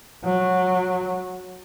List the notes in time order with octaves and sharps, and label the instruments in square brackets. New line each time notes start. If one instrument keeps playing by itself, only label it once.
[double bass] F#3